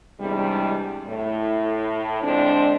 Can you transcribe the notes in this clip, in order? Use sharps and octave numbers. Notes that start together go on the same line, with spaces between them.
E2 G#2 C3 G3 G#3 D4
A2
D3 F3 G#3 C4 D4